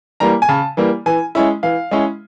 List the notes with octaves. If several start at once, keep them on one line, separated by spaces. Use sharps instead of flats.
E3 G3 A#3 A#5
G#5
C#3 A5
E3 G3 A#3
E3 G#5
G#3 C#4 E4
E3 F5
G#3 C#4 E4